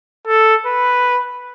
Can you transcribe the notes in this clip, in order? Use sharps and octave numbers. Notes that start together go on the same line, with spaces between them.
A4
B4